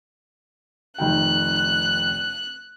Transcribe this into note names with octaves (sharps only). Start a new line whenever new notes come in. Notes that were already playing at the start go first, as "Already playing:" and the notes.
F1 D#3 G5 F#6